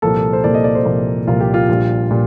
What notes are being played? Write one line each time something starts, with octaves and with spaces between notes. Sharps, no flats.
C2 A#2 F3 A#3 A4
C5
C2 A#2 F3 A#3 D5
D#5
D5
C5
C2 A#2 F3 A#3
C2 A#2 F3 A#3 F4
G4
F4
A#1 A#2 G3
A#2 G3